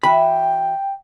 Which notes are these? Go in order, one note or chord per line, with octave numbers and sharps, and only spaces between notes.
E3 F#4 E5 G5 B5